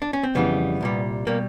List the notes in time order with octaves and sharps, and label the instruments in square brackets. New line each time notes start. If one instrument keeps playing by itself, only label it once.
[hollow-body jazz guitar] D4
C#4
C4
F2 C#3 E3 G3 B3
C2 A#2 G3
B2 G3 A#3